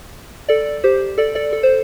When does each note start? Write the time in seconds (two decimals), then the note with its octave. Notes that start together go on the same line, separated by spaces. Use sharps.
0.49 A4 D5
0.84 G4 C5
1.18 A4 D5
1.35 A4 D5
1.53 A4
1.63 C5